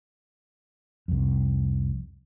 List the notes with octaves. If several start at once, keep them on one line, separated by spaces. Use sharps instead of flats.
C2 F2